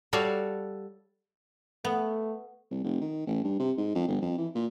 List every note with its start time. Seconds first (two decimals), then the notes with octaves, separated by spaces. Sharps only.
0.13 G3 F#4 A4 C#5 D5 F5
1.85 A3 B3
2.71 C2
2.84 F1
3.01 D#3
3.27 A1
3.44 G2
3.60 C3
3.77 G#2
3.95 F2
4.08 G1
4.22 F2
4.38 E3
4.55 A#2